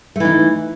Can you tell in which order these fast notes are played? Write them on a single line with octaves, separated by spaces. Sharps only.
A3 E3 D#4